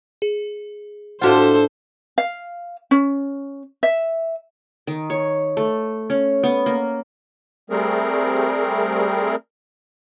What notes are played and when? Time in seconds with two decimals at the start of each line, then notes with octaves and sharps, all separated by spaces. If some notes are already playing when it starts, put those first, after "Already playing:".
0.22 G#4
1.22 A2 D4 F4 F#4 A4 C5 F5 F#5
2.18 F5
2.91 C#4
3.83 E5
4.87 D#3
5.10 C#5
5.57 A3
6.10 C#4
6.43 B3
6.66 A#3
7.70 G3 A3 C4 G#4 A#4